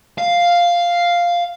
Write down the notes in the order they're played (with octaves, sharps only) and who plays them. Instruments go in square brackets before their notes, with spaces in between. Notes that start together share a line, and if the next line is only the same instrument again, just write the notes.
[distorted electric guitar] F5